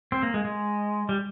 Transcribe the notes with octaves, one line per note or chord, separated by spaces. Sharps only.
C4
A#3
G#3
G#3
G3